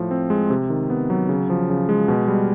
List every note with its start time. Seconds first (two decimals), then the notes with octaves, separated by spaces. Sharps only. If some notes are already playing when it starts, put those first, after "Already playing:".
Already playing: A2 F3
0.11 C4
0.30 G#3
0.50 C3
0.70 D#3
0.90 B3
1.10 F#3
1.29 C#3
1.50 F3
1.69 C#3
1.89 G#3
2.08 B2
2.28 G3